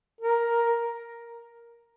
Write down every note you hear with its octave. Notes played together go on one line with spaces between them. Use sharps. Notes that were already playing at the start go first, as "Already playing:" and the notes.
A#4